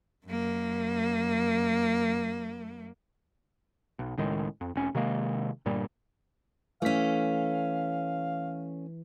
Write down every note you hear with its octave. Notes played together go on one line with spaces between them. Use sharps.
F#2 A#3
B1
C#2 A2 D#3 G#3
F2
F1 C#4
C3 D#3 G#3 A#3
G1 G2 A#2 G3
E3 A3 C#4 F5 B6